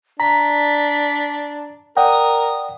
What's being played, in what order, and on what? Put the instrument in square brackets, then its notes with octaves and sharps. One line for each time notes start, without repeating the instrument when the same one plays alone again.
[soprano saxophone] D4 [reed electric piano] A#5 [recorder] B6
[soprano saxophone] A#4 [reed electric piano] D5 F#5 G5 [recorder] D#6